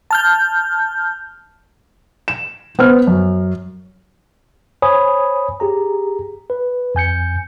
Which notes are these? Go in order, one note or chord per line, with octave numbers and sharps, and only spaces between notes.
A5 F6 G6
E7
B3 C5 F6
F#2
C5 C#5 G#5 B5 D#6
G4 G#4 A#5
B4
F2 G#5 G6 C#7